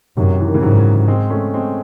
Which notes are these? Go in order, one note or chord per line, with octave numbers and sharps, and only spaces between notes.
F#2 C3 D#3
E3
D#3
C#3 E3
G#2 D#3 F#3
G#3 C4
A3 C#4
G#3 C4